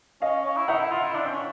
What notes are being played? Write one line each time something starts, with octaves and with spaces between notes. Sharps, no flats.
C#4 D#5 F5
C#4
E4
D#4 E5 F#5
E4
F4
E4
D4
C4
C#4